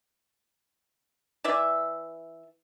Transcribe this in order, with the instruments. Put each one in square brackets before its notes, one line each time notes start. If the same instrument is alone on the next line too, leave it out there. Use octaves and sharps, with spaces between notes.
[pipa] E3 D5 E5